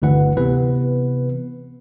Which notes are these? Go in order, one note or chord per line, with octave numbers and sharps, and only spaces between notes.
G1 D2 E3 B4 F#5
C3 E3 B3 B4